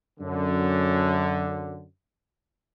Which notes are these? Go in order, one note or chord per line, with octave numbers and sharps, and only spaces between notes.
F#2 D3